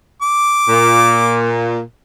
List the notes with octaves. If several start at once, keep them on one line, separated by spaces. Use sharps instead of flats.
D6
A#2